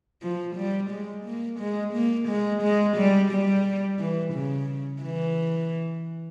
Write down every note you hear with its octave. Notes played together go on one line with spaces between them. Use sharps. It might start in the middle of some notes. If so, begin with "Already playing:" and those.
F3
G3
G#3
A#3
G#3
A#3
G#3
G#3
G3
G3
E3
C#3
E3